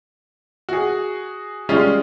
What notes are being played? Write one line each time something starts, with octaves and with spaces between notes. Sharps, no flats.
F#4 G#4
G3 G#3 C#4 F4 G#4